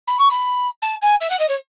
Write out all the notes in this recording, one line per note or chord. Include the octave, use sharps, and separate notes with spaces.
B5
C#6
B5
A5
G#5
E5
F#5
D#5
C#5